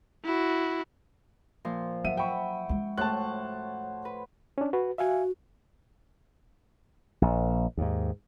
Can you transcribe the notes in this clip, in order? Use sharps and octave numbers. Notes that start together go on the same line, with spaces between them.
E4 F#4
A#2 F3 C6
F#3 E5 F#5 D#7
E5 G5 B5 C#6
G#3 C#4
A2 F#4 C5 C#5 A5 F#6
B4
C#4 D4
F#4 B4
F#4 E5 F5 G#5
A#1
D#2 G#2